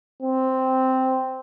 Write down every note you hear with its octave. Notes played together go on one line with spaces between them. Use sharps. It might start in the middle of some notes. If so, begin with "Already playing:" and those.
C4